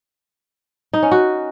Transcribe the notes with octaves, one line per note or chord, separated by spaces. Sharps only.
D#4
C#4
F#4